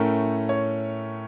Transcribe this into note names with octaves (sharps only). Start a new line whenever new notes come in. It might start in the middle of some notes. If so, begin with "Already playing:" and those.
Already playing: A2 A3 C#4 A#4
C#5